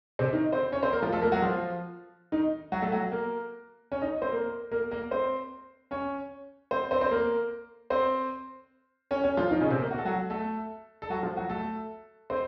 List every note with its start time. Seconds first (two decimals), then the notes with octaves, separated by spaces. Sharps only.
0.19 C3 C4
0.33 D#3 D#4
0.52 C4 C5
0.72 C#4 C#5
0.83 C4 C5
0.92 A#3 A#4
1.02 F3 F4
1.12 A3 A4
1.22 A#3 A#4
1.32 F#3 F#4
1.42 F3 F4
2.32 D#3 D#4
2.72 F#3 F#4
2.82 A3 A4
2.92 F#3 F#4
3.12 A#3 A#4
3.92 C#4 C#5
4.02 D#4 D#5
4.22 C4 C5
4.32 A#3 A#4
4.72 A#3 A#4
4.91 A#3 A#4
5.11 C4 C5
5.91 C#4 C#5
6.71 C4 C5
6.91 C4 C5
7.01 C4 C5
7.11 A#3 A#4
7.90 C4 C5
9.11 C#4 C#5
9.24 C#4 C#5
9.37 F3 F4
9.51 D#3 D#4
9.61 C#3 C#4
9.71 C3 C4
9.81 A#3
9.91 F#4
9.98 A4
10.05 F#3 F#4
10.30 A3 A4
11.02 A4
11.10 F#3 F#4
11.23 F3 F4
11.37 F#3 F#4
11.49 A3 A4
12.30 C4 C5